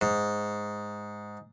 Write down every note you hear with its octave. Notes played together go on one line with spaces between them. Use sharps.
G#2